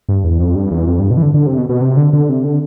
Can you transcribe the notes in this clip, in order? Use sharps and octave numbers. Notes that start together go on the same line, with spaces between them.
G2
E2
F2
G2
E2
F2
G2
B2
E3
D3
D3
C3
B2
B2
C3
D3
D3
C3
D3